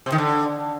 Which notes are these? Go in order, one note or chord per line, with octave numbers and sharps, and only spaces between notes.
C3
D#3
D3